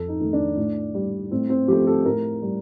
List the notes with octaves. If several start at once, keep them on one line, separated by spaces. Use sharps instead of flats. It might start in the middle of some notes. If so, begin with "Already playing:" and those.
Already playing: F2 A4
D#4
D#3 A3
D4
A2
G3
A2 C4
C4
F3 A3 G4
A4
A2 A#4
G3